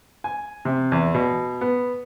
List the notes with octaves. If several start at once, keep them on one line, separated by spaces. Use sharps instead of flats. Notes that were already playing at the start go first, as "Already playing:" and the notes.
G#5
C3
E2
B2
B3